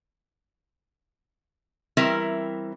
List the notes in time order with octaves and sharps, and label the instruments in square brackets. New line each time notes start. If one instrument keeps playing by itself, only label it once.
[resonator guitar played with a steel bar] E3 G3 C4 E4 A#4 E5